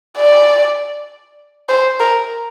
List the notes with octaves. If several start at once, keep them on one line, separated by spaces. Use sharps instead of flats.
D5
C5
A#4